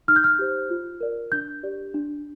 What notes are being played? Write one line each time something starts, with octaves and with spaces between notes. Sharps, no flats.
D#4 F6
G6
F6
G4 C5
F4
A#4 D5
D4 G6
G4 D5
D4